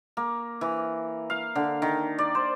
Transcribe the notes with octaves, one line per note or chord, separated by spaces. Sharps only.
A#3
E3
F5
D3
D#3
D5
C5